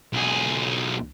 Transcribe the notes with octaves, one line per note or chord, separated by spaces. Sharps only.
B1 G#4